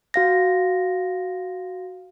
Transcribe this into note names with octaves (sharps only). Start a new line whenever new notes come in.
F#4 F5 A#6